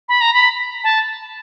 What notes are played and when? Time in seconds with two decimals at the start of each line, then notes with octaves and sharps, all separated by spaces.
0.09 B5
0.21 A#5
0.34 B5
0.84 A5